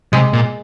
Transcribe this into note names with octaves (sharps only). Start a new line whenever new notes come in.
C3 G#3
A#2